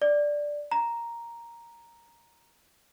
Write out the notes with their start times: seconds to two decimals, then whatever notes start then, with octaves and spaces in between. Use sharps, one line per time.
0.02 D5
0.71 A#5